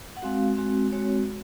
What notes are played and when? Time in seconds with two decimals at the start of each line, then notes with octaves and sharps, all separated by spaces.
0.16 F#5
0.22 G#3 C4 F#4 F5
0.57 G#3 C4 F#4
0.92 G#3 C4 F#4 C#5